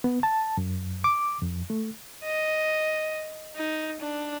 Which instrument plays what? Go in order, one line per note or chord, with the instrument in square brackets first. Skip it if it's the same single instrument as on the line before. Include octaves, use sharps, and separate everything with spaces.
[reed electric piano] B3
A5
F#2
D6
F2
A3
[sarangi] D#5
D#4
D4